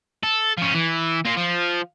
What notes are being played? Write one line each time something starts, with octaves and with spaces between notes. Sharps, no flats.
A4
F3 C#4
E3
A#3 F4
F3